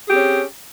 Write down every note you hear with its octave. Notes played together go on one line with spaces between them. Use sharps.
C4 C#4 G4 G#4